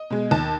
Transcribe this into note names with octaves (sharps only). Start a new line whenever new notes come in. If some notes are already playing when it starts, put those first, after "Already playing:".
Already playing: D#5
B2 G#3
D#2 A5